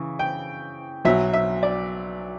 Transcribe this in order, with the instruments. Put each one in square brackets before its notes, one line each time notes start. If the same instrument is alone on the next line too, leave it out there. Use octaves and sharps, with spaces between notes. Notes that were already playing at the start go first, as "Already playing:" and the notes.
Already playing: [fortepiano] C#3 E3
G5
B1 B2 F#3 E5
E5
D5